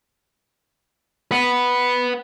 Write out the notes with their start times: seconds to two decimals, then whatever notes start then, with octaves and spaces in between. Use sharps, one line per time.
1.31 B4 F#5